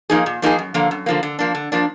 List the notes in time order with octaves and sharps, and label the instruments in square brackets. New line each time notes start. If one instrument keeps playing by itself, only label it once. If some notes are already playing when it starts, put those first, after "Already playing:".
[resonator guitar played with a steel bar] F3 A#3 D#4 G#4
A#2
F3 A#3 D#4 G#4
F#2
D3 F3 A#3
F#2
D3 F3 A#3
D3
F3 A#3 D4
D3
F3 A#3 D4